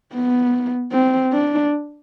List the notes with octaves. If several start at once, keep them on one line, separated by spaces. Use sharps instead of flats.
B3
C4
D4